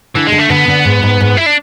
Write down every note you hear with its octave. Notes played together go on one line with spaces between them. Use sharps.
D3 E3
G#3
D3
A3
D3 B3
D3
G#2
G#2
G#2
E4
D4